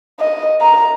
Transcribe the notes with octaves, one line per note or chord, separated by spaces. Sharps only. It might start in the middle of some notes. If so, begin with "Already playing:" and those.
D#5
A#5